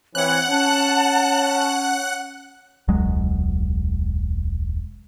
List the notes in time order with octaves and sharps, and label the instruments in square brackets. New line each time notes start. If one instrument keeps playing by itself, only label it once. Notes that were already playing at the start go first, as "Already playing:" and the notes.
[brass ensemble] E3 C4 [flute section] C#5 [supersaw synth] F#5 F#6
[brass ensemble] C#4 [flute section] A5
[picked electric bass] E1 C#2 F#3 G#3